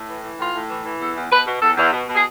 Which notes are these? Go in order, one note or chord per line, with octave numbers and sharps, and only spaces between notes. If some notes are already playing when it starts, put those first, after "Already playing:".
Already playing: A2
E3
E3
A2 F4
A2
E3
E3
E2 A4
E2
B2 B4
B2
E2 A4
E2
B2
B2
G#4